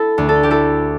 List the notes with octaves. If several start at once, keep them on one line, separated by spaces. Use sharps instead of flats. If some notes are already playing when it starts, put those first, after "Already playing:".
Already playing: E4 A4
D2
A4
G4
E4 A4